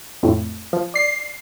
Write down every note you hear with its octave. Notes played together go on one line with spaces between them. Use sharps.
F2 A2
F3
D5 C7